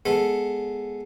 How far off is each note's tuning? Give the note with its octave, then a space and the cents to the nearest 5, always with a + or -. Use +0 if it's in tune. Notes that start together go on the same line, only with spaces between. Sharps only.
G#3 +0 B3 -5 A4 +0